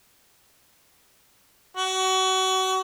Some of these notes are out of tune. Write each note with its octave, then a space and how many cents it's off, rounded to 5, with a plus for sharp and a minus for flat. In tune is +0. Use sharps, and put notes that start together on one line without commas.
F#4 +30